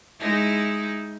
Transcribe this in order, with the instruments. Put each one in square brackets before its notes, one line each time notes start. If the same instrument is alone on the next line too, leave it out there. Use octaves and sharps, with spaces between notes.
[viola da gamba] G#3 D#4 E4